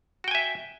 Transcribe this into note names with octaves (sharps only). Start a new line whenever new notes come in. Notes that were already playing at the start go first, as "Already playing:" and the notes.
F#4 E5 G5 G#5